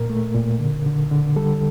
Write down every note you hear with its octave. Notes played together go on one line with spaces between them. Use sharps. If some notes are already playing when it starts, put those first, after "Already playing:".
Already playing: A#2 A#4
A3
A#2
D3
D3
D3
G3 A4